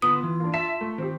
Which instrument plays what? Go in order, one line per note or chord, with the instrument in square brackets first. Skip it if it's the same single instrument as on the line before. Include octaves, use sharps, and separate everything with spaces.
[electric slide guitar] D3 B3 B4 [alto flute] F4 [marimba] D#6
[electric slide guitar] E3
[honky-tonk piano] A#3 D4
[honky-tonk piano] E5 B6 [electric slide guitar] A5
[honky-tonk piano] A3
[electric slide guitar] D#3 [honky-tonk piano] C4 G4